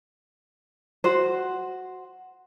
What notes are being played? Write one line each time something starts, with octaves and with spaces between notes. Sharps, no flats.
F#4 C5